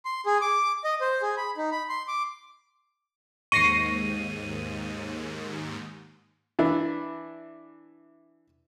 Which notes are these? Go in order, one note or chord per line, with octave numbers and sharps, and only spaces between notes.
C6
G#4
D6
D#5
C5
G#4
B5
D#4
B5
C6
D6
D#2 G#2 C#6 A#6 C7 D#7
E3 D4 E4